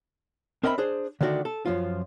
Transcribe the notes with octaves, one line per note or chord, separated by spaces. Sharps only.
C4 A#4 D#5 E5 G#5 B5
D4 G#4 C5
D3 D#3 A3 D4 F#4
A4
F#2 F3 F4